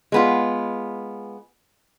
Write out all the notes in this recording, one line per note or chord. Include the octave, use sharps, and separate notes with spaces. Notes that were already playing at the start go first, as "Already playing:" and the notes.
G#3 B3 F4